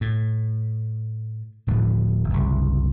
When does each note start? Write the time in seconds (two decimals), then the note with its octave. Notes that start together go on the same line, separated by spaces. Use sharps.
0.01 A2
1.67 D1 A2 D3 F3
2.29 F#1 C2